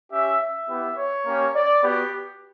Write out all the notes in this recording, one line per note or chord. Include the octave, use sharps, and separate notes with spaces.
C#4 G4 E5
E5
B3 E4 G4
C#5
A#3 C#4 G4
D5
B3 F#4 G4